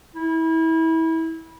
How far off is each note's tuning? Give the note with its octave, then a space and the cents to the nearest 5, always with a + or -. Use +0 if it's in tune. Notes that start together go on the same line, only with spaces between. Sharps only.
E4 -25